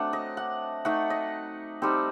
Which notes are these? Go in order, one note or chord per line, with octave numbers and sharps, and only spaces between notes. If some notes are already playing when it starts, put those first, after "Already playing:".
Already playing: F#3 A3 C4 D4 F#5
D#5
F#5
A3 D#4 F#5
D#5
G3 C4 D#4 A4